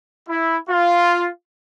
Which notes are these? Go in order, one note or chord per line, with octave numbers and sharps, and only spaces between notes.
E4
F4